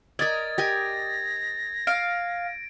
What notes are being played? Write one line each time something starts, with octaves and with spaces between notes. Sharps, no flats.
A#4 D5 D#5 G#6 A6
G4 A#4 G#5 A#6
F5 D7